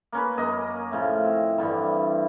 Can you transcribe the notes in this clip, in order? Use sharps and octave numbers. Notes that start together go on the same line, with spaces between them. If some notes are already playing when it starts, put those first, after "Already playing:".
A#3 C#4 B4
F#2 A#3 D#5
A2 C#3 F3
C4
G2 D3 E3 G3